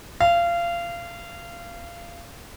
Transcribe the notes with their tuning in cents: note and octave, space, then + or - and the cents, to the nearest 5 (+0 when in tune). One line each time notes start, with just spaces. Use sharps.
F5 -25